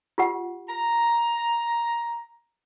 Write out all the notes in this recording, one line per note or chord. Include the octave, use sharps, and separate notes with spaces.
F4 G4 F#5
A#5